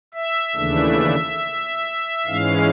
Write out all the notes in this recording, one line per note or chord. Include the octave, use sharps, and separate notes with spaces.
E5
D#2 C#3 E3 A3 D4
G#2 E3 G#3 C#4 F5